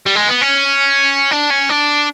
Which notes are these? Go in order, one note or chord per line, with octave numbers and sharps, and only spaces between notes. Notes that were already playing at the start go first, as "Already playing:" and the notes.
G3
G#3
B3
C#4
D4
C#4
D4